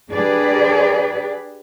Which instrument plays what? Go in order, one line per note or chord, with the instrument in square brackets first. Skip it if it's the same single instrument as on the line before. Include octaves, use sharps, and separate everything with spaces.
[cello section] D4 G4 G#4 B4 D5